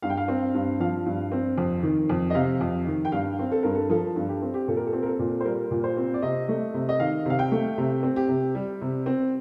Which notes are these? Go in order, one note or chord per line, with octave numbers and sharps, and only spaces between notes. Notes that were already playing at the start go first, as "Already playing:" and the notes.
G2 F5
G5
F5
C4
G2
F3 F5
G2
C4
F2
D#3
F2
D#5
C3 F5
F2
D#3
G5
G2 F5
C4
A4
G2 A#4
A4
F3 A4
G2
G4
C4
G4
A#2 A4
A#4
A4
C4
A#4
A4
A#2
C5
G3 A#4
A#2
C5
C4
D5
C3 D#5
A3
C3
D#5
D#3 F5
C3 F5
G5
A3
C3
C4
G4
C3
G3
C3
C4